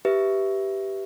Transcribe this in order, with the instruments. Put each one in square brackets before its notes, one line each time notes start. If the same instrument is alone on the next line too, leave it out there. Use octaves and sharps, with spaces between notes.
[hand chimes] G4 B4 E5